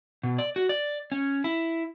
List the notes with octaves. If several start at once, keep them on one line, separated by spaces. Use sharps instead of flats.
B2
D5
F#4
D5
C#4
E4